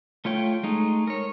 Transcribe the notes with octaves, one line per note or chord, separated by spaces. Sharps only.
A3 F4 C#5 G5
G#3 A3 D#4
A#4 C#5